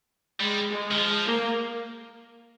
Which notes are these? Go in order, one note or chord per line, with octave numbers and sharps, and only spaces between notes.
G3 G#3
G#3
D#3
F3
A#3